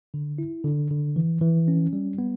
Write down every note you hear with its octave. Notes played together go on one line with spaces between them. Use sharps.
D3
E4
D3
D3
E3
E3
C#4
G3
B3